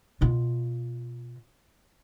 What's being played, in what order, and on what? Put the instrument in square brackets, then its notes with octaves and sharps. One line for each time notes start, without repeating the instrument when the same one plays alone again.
[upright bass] B2 F4